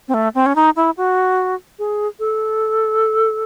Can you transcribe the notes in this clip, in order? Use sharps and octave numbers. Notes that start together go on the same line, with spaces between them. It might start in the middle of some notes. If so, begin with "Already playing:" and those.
C4
A3
C4
C#4
D#4
E4
F#4
G#4
A4